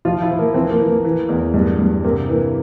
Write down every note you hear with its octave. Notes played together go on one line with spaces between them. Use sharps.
F3 F4
E4
F3
A#3
E3 C4
A#3
E3
A#3
E3
E2
G2
G2
C3 A#3
E3 A#3